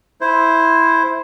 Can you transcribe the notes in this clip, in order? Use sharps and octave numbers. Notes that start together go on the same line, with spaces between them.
E4 C5